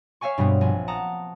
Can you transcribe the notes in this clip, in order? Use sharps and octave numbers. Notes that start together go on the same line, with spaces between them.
C#5 E5 F5 G#5 C#6
G2 B2 G3 B3 C4
A#1 G#5
F#5 A5 A#5 D#6